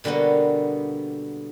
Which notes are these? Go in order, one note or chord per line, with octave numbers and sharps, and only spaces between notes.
B2 D3 G3 A#3 B3